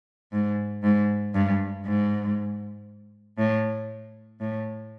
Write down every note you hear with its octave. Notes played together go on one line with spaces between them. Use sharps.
G#2
G#2
G2
G#2
A2
A2